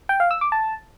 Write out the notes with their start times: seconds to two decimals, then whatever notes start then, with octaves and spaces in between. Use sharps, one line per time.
0.09 G5
0.20 F5
0.31 E6
0.41 D6
0.52 A5